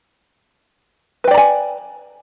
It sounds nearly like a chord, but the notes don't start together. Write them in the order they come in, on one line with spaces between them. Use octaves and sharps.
B4 G5 D5 A#5 G#5